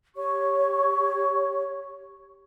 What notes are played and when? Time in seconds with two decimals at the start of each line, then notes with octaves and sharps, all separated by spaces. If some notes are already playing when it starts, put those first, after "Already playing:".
0.16 G4 C#5 C#6